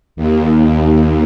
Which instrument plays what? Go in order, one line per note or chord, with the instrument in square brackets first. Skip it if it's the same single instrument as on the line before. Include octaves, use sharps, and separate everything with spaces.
[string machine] D#2